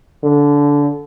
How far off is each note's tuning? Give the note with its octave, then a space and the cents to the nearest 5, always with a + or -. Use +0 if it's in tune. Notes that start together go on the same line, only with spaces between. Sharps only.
D3 -20